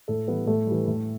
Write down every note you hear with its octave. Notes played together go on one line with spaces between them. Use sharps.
A2 A4
E3 G3 B3
A2 A3
E3 G3
A2